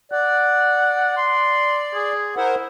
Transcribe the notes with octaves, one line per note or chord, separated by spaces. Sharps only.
D5 F#5
C6
G#4
E4 A#4 C5 F#5